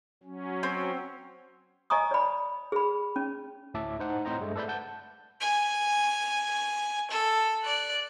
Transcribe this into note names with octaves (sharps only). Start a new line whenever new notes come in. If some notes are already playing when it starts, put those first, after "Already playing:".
F#3 C#4
C4
D#5 G#5 A#5 C#6 D#6
D5 B5
G#4 B5
C#4
D2 A2 E5 A5 D6
D#4 C5 F#5
A2 C4 C5 D#5 A#5
G2 G#3 A3
A4 B4 D5 E5 B5 G6
F#5 A5 G6
G#5
A4
D5 F#6